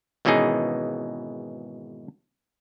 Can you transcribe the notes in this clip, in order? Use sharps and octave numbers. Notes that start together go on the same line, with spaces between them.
G#1 B2 E3 C#4 D#4 G#4